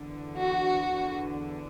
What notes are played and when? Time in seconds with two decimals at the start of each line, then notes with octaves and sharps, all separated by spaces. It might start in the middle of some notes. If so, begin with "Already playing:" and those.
Already playing: E2 D3
0.38 F#4
0.94 E2 D3